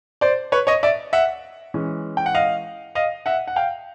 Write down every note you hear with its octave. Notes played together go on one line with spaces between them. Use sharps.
C5 D5
B4 C#5
C#5 D#5
D5 E5
E5 F#5
E3 G#3 C#4
G5
F#5
D#5 F5
D#5 F5
E5 F#5
F#5
F5 G5